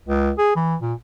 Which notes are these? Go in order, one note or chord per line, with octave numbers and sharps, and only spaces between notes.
C#2
G#4
E3
A#2